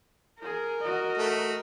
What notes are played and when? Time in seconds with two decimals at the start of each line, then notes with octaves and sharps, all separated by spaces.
0.42 G#4 A#4
0.80 F#4 D#5
1.18 A3